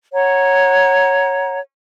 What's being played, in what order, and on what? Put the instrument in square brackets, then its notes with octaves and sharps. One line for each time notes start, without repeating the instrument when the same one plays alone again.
[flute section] C#5 F#5 A#5